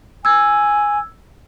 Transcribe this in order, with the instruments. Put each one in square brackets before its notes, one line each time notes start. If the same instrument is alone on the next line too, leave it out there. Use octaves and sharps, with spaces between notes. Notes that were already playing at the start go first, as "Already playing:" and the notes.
[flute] G#5 [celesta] E6 G#6